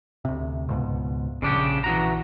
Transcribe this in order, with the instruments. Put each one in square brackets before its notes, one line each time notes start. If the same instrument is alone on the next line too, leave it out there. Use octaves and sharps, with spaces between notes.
[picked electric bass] D2 C3
C#2 G#2 B2
[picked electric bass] A#1 [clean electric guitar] C#3 D4 G4
[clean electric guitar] E3 F#4 A#5